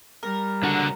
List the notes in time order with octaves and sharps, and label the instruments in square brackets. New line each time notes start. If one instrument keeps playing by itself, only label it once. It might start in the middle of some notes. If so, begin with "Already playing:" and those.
[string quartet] G3 [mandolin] A#4
[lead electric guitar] C#2 F#4 [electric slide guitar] D3